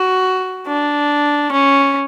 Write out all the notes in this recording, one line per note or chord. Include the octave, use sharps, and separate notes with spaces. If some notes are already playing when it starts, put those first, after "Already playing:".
Already playing: F#4
D4
C#4